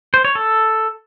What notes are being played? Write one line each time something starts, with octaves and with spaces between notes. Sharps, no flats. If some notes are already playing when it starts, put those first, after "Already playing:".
C5
C#5
A4